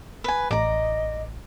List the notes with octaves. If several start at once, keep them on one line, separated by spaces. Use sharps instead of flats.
B4 G#5
A1 D5 D#5 A#5